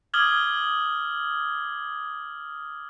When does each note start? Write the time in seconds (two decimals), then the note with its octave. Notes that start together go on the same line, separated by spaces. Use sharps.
0.14 D6 D#6 F6 G#6 F#7 G7